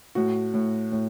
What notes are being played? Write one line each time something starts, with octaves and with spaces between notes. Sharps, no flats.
A2 F#4
A2
A2